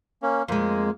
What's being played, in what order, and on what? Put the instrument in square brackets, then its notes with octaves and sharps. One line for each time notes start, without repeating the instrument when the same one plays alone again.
[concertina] A#3 C#4
[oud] F2 G#3 [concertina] A#3